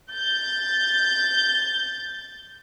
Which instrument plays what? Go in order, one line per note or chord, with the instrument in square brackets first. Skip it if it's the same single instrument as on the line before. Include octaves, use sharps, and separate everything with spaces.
[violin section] G6 A6